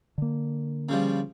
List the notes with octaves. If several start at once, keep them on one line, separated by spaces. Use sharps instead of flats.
D3 A#3
C#3 F3 G3